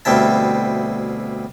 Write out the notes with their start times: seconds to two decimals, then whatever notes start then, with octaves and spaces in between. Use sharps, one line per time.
0.05 D2 B2 G3 C4 E4 A5